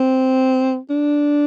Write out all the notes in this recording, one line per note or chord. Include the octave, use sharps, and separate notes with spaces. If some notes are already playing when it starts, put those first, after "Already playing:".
Already playing: C4
D4